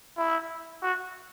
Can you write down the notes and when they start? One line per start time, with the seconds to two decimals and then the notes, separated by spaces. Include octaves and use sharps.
0.18 E4
0.83 F#4